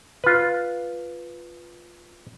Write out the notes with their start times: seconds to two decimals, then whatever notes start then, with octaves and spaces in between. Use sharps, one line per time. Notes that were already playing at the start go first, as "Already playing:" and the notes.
0.24 F4 B4